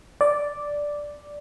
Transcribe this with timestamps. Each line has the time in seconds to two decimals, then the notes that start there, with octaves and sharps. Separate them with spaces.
0.21 D5